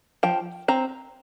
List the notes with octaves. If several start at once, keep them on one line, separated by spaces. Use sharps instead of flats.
F3 G5
C4 A#5